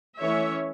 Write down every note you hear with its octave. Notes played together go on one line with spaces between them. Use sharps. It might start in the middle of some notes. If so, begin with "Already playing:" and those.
E3 A3 C#4 C#5 E5